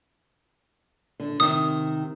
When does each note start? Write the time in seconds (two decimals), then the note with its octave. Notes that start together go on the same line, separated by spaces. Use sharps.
1.20 D3
1.40 C3 D#3 D#6